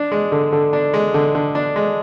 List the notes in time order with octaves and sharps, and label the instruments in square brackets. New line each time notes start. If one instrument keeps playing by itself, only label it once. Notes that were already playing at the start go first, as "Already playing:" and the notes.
Already playing: [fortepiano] D4
G#3
D3
D3
D4
G#3
D3
D3
D4
G#3